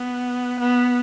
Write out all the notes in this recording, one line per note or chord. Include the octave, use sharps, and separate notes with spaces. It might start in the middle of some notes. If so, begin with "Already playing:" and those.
Already playing: B3
B3